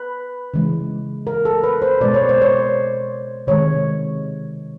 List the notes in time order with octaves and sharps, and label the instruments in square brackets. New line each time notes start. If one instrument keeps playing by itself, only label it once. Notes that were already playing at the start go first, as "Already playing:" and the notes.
Already playing: [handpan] B4
C#3 E3 G#3
A#4
A4
B4
C5
B2 G#3 D5
C#5
C5
C#5
C3 D#3 G#3 C#5